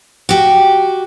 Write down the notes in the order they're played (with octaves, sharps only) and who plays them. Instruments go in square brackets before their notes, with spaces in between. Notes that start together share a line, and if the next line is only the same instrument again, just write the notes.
[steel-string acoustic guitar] F#4 G4